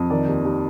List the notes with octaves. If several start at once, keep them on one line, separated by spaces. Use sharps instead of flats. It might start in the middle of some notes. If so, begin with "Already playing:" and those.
Already playing: F2
D#3 A#4 D5
D#2
D#2